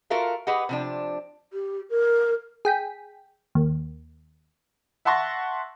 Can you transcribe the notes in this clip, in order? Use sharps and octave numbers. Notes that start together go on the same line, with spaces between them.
F4 F#4 A4 A#4 E5 F5
G4 G#4 B4 D#5 F#5
C3 F3 D4
G4
A#4
G#4 G5 B6
D#2
E5 F#5 A5 C6 C#6 A#6